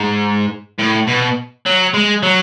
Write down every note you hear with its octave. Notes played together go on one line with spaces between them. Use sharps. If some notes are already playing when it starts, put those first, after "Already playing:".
Already playing: G#2
A2
B2
F#3
G#3
F#3